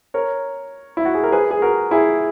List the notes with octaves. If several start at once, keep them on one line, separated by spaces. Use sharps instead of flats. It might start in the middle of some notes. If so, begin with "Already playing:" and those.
A#4 C#5
E4
F#4
G#4
A#4
G#4 B4
G#4
F#4 A#4
E4 G#4